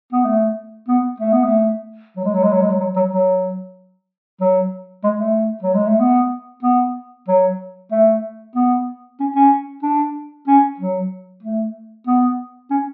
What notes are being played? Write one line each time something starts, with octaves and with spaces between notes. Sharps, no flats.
B3
A3
B3
A3
B3
A3
F#3
G#3
F#3
G#3
F#3
G#3
F#3
F#3
F#3
F#3
F#3
G#3
A3
F#3
G#3
A3
B3
B3
F#3
A3
B3
C#4
C#4
D4
C#4
F#3
A3
B3
C#4